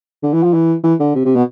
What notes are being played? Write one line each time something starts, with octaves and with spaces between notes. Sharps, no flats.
D3
E3
F3
E3
E3
D3
C3
C3
B2